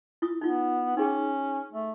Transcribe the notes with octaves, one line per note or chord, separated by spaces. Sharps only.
E4 F4 D#6
B3 D#4 F4
C#4 D#4 G#4 G5
A3